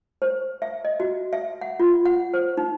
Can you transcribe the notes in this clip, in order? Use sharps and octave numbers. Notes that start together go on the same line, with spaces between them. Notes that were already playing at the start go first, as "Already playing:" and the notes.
C5
E5
D#5
F#4
E5
F#5
F4
F#5
C5
D#4